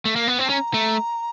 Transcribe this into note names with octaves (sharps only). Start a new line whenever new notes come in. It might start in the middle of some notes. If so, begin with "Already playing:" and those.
A3
A#3
B3
C4
A5
C#4 A#5
A3